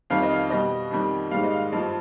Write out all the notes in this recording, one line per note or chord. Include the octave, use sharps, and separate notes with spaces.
F2 D#3 G3 F5
D#5
F5
B2 G3 D#5
F2 D#3 G3
G#2 D#3 G3 F5
D#5
F5
G2 F3 D#5